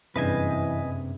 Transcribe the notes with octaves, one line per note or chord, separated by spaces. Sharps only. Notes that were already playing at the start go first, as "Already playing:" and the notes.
F#1 G2 C3 E3 B4 D#5 G#5